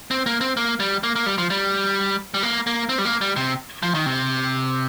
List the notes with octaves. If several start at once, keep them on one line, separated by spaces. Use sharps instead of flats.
C4
A#3
C4
A#3
G3
A#3
A#3
G3
F3
G3
G3
A#3
A#3
C4
G3
A#3
G3
C3
F3
D#3
C3